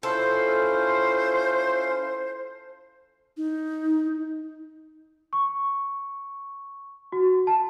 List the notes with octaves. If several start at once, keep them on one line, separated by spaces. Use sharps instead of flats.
C#4 E4 F4 A4 C5
D#4
C#6
F#4
A5